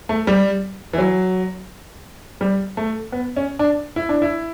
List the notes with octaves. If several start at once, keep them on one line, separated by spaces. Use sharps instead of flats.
A3
G3
E3
F#3
G3
A3
B3
C#4
D4
E4
D4
E4